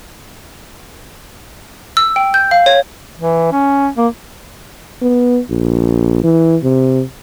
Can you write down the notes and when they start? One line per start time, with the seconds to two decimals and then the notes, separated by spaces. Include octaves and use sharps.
1.97 E6
2.16 G5
2.34 G6
2.51 F5
2.66 C#5
3.19 E3
3.52 C#4
3.97 A#3
5.02 B3
5.50 A#1
6.23 E3
6.63 C3